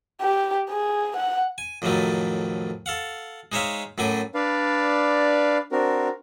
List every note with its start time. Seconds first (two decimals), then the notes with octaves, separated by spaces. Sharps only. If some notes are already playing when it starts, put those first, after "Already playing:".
0.21 G4
0.70 G#4
1.17 F#5
1.58 G#5
1.82 F2 A2 C3 D#3 F#3 A3
2.86 A4 F5 F#5
3.52 G#3 D#4 C5 C#5 E5 F5
3.98 F#2 A2 F#3 A3 G#5 D6
4.34 D4 B4 D5 F5
5.72 C4 D4 F#4 A#4